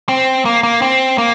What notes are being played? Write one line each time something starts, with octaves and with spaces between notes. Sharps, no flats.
C4
A#3
A#3
C4
A#3